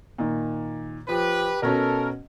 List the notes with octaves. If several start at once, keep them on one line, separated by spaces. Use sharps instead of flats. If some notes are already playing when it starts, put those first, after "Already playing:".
A#2 D#3
F3 G4 B4
B2 C#4 F#4 A4 A#4